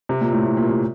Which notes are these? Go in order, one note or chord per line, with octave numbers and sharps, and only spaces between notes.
C3
A#2
A2
A2
A#2
C3